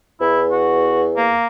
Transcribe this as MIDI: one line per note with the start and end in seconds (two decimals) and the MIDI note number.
0.21 1.36 40
0.21 0.42 64
0.51 1.02 66
1.17 1.47 58